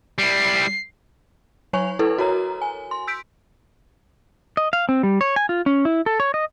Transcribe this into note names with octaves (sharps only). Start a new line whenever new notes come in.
G3 E4 C7
F#3 C#5 G#5 C#6 F7
E4 A4 B4
F#4 A#4 C#5 A#5
G#5
C6
E6 G6 B6 D7
D#5
F5
C4
G3
C#5
G#5
F4
C#4
E4
A4
C#5
D#5